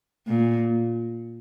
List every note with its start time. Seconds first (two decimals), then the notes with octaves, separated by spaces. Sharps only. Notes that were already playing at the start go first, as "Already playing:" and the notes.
0.27 A#2